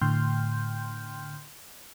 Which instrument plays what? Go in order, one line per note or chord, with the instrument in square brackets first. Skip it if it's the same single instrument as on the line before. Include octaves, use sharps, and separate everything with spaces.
[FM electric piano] A2 D3 G5 C6 F6 G6